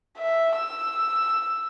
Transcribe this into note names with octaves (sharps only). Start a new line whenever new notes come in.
E5
E6